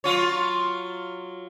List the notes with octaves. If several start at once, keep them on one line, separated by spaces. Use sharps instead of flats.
F#3 F4 C#5